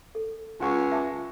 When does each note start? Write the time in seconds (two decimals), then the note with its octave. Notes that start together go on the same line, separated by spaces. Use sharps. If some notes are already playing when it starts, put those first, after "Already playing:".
0.15 A4
0.60 C#2 F4 F#5 G#5 C#6
0.91 E5 A5 D6